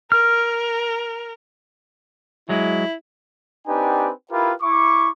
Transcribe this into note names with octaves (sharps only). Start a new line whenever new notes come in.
A#4 F6
F#3 G#3 E4
C4 D4 D#4 G4 B4 G#5
E4 F4 G4 A#4 B4
E4 C#6 D6